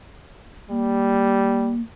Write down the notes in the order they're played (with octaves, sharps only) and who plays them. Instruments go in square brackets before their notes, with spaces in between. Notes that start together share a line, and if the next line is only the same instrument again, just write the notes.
[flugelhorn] G3 [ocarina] A#3